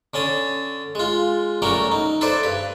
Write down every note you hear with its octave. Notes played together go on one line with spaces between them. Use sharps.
D3 C#4 A5 D#6
G#3 F4
F#3 G3 A3 C#4 F#4 A#4
D#4
A4 B4 C5 D5 E5
G2 B4